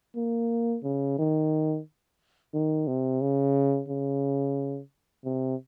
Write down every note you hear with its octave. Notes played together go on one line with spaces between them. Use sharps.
A#3
C#3
D#3
D#3
C3
C#3
C#3
C3